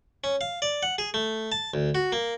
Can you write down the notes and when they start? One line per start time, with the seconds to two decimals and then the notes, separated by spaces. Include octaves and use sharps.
0.24 C#4
0.41 F5
0.62 D5
0.83 F#5
0.98 G#4
1.14 A3
1.52 A5
1.74 D2
1.95 F#4
2.12 A#3